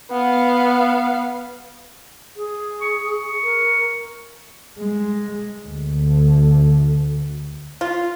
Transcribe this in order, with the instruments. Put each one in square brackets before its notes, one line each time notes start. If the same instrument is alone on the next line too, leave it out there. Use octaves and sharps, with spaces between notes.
[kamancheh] B3 F5
[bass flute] G#4
[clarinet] C#6
[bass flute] A#4
[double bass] G#3
D2
[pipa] F4